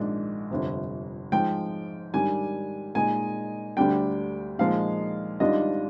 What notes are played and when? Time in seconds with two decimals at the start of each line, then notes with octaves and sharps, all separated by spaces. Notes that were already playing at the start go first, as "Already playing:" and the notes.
Already playing: A#1 G#2 D#3 G#3 D4
0.51 G1 F2 C3
1.32 G#2 F3 G#3 G5
2.14 G#2 D#3 G3 D4 G#5
2.95 A#2 G#3 D#4 G#5
3.77 D2 D3 G3 D4 G5
4.59 A#2 F3 G#3 D#4 F5
5.40 G#1 G#2 G3 D4 F4 D#5